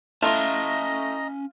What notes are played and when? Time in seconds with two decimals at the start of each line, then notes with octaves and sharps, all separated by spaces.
0.22 A3 C#4 E4 F4 D#5 A5 A#5